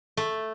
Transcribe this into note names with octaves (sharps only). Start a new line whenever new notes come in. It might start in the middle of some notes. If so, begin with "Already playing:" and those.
A3